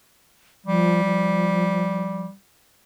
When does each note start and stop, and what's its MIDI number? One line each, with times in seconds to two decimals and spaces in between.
0.66 1.02 53
0.66 2.34 55
1.04 2.26 53